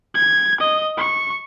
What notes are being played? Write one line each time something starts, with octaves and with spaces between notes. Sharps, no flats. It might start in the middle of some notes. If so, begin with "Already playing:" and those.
G#6
D#5
C#6